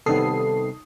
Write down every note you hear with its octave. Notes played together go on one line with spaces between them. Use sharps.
C3 D#3 G3 B3 A4 D#6 C7